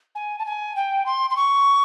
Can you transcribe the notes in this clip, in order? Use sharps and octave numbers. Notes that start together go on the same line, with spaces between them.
G#5
A5
G#5
G5
C6
C6
C#6